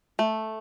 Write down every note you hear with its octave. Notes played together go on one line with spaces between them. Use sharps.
A3